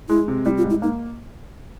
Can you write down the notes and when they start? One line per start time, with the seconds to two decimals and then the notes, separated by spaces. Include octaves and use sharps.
0.09 G#3 E4
0.28 C3
0.45 G3 E4
0.57 F4
0.64 G#2
0.70 E4
0.82 A#3 D#4